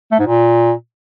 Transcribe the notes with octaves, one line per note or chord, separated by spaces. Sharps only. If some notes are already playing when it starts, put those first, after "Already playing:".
A3
G#2
A#2